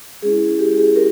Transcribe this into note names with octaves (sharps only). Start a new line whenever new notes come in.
G#3 C#4 E4 G#4
G4
G#4
G4 A#4